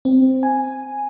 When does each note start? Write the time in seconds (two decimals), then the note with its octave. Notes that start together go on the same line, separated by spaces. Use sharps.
0.05 C4
0.43 G#5